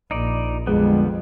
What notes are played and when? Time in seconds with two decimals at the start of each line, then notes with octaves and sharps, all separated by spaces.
0.11 A#1 D#4 D5
0.67 F2 D3 G3 G#3 B3